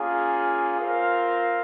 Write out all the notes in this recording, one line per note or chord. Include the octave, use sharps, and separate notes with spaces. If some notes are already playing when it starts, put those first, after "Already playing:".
Already playing: A#3 C#4 F4 G#4
C4 F4 A#4 F5